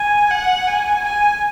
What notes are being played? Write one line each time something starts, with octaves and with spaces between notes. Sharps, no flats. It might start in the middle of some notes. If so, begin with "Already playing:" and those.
Already playing: G#5
F#5
G#5
G#5